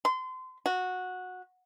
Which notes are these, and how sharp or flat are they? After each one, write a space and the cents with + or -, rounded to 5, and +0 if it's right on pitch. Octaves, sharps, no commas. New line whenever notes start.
C6 -30
F#4 -15